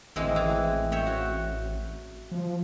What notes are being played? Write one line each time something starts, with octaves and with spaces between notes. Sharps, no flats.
A1 E3 G#3 C4
E3
C#5 E5 G5
F#4
F3